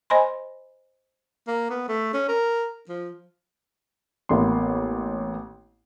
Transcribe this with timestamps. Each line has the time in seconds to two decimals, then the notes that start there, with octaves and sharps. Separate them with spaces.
0.10 C5 D#5 G#5 B5 C6
1.48 A#3
1.70 B3
1.88 A3
2.14 C#4
2.29 A#4
2.89 F3
4.29 A1 A#3 B3 C6